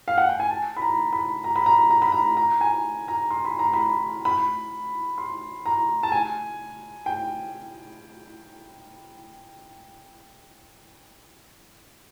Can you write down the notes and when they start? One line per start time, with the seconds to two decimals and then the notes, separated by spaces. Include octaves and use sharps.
0.08 F5
0.18 F#5
0.29 G5
0.40 G#5
0.51 A5
0.76 B5
0.82 A#5
1.13 B5
1.44 A#5
1.56 B5
1.66 A#5
1.91 A#5
2.02 B5
2.12 A#5
2.37 A#5
2.61 G#5
3.08 A#5
3.30 C6
3.45 B5
3.59 A#5
3.73 B5
4.25 B5
5.18 C6
5.66 A#5
6.03 A5
6.12 G#5
7.06 G5